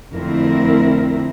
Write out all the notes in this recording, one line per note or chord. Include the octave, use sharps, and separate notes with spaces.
F2 D3 A3 C4 E4 A#4